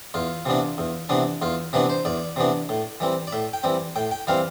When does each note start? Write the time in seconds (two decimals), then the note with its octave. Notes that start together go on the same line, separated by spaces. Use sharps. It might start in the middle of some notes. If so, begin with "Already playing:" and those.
0.14 E2 F4
0.45 C3 E3 B3 D4
0.78 E2
1.09 C3 E3 B3 D4
1.42 E2 F4
1.73 C3 E3 B3 D4 B4
1.90 C5
2.05 E2 D5
2.36 C3 E3 B3 D4
2.69 A2
3.00 E3 G3 C4
3.27 D5
3.32 A2 E5
3.53 G5
3.63 E3 G3 C4
3.96 A2 G5
4.11 G5
4.27 E3 G3 C4 F5